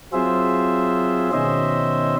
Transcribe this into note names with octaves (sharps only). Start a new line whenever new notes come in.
F#3 C4 F4 G#4 C5 E5
B2 D#3 C#4 C5 D#5 E5